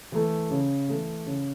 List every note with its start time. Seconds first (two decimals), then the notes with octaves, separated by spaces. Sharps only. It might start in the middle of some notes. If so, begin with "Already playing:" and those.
0.12 E3 A3
0.50 C#3
0.88 E3 A3
1.26 C#3